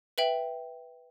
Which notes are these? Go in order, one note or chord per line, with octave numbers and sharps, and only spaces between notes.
B4 E5 G5 F#7